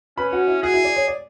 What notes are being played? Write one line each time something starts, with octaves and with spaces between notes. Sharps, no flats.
C#4 B4 B5
F#4 F#5
E4 E5
F#4 G#4 F#5
E4 E5
D5
C#5
D5